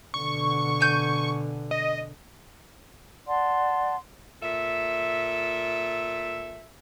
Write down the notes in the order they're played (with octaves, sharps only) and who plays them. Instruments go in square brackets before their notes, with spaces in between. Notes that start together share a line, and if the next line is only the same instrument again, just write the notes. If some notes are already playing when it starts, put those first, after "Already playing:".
[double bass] B2 D3 [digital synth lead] C#6
[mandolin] G#5 G6
[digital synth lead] D#5
[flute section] D5 F#5 A5 C6
[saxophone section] A#2 A4 E5